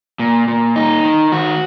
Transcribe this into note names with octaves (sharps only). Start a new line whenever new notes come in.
A#2
A#2
D#4
D#3
F#4